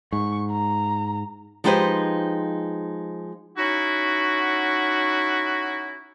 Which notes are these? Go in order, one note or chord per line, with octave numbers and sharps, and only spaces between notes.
G#2 C#6
A#5
F3 G#3 D#4 G4 B4 C5
C#4 D#4 E4 F#4